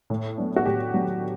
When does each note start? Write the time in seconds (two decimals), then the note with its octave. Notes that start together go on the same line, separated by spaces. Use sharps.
0.10 A2
0.38 F#3 B3 D4
0.56 F#4
0.66 A2 G4
0.94 F#3 B3 D4